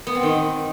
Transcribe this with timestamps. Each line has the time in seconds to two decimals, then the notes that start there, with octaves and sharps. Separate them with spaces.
0.07 B3
0.15 C4
0.23 D#3